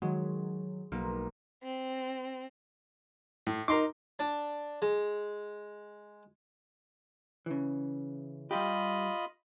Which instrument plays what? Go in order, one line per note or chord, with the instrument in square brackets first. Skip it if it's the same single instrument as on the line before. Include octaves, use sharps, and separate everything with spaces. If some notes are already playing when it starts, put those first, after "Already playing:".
[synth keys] D#3 F#3 [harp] G#3
[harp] B1 A#3
[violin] C4
[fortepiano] A2
[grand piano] D#4 A#4 [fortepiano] A#5 C6 D6
[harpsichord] D4
G#3
[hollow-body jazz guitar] C#3 E3
[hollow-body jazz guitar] G3 G4 [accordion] F4 D#5 B5